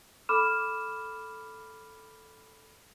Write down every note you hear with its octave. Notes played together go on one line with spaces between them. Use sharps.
A4 B5 D6 F6 E7